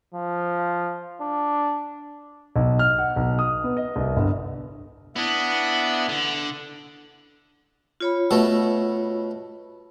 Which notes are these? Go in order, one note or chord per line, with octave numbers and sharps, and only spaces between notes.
F3
D4
B1
F6
F#5
B1
D#6
B3
D#5
C2
G1
B3 D4 E4 D#5
D3
F4 C#5 B5
B2 A3